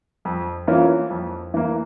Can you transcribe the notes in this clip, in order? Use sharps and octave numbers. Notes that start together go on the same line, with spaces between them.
F2
E3 A#3 C#4 F4
F2
E3 A#3